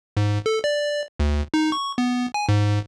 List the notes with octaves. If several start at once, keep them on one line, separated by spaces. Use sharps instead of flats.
G#2
A4
D5
D2
D#4
C#6
B3
G#5
G#2